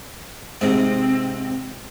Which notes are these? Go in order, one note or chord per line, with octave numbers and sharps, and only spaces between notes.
G#2 C3 C4